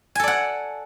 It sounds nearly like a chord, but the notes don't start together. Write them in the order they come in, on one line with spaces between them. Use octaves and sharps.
G#5 A4 D5 F#5